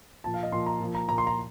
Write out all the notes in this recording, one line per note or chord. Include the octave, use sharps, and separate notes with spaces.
A#2 F3 A5
F5
D#5
A#2 F3 C6
A#5
A#2 F3
A#5
A#2 F3 A#5
C6
A#5